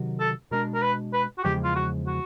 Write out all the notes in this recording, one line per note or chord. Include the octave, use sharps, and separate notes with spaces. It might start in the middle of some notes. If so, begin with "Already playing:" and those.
Already playing: C3 D#3 F#3
A4
B2 G#3 B3 D4 A#4
A#4
B4
B4
F#4
E2 C#3 F3 G#3 G4
F4
F#4
F#4